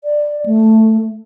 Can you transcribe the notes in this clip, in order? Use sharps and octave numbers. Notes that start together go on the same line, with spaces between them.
D5
A3